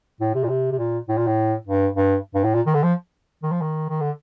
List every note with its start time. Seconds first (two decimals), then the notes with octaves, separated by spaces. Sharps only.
0.21 A2
0.35 C3
0.44 A#2
0.49 C3
0.71 C3
0.78 A#2
1.08 A2
1.17 A#2
1.27 A2
1.67 G2
1.96 G2
2.34 G2
2.44 A2
2.54 A#2
2.66 D#3
2.74 D3
2.83 F3
3.43 D#3
3.52 F3
3.62 D#3
3.89 D#3
4.00 D3